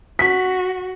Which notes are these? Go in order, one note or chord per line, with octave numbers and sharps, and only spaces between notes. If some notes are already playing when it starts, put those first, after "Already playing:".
F#4 B6